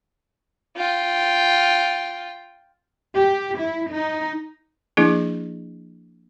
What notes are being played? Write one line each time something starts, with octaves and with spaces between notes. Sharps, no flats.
F4 G5
G4
E4
D#4
F3 A#3 D4 E4 G#4